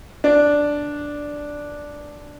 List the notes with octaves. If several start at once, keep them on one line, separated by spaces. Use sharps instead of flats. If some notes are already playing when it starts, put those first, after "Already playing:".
D4